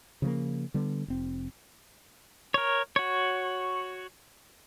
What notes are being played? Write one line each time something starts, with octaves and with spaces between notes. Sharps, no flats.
C#3 F3 G#3 A#3
D3 G3 B3
F1 C4
A#4 C#5
F#4 C#5